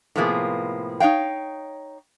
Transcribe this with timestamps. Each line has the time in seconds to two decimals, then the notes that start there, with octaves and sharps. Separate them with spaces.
0.16 A2 C3 F3 A#3 B3 G#4
1.00 D#4 C#5 F5 G5